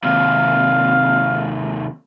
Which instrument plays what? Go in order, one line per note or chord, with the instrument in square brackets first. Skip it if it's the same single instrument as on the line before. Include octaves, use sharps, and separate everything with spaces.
[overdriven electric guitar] D#2 C3 [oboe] F5